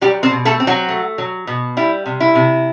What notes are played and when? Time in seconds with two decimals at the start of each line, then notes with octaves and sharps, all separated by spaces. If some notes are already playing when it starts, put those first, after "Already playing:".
0.01 F#3 G3 G4
0.23 C4 C5
0.31 B2
0.45 A3 A4
0.60 C4
0.67 F#3 F#4
0.88 A3
1.18 F#3
1.47 B2
1.77 G3 E4
2.06 C3
2.20 E4
2.35 C3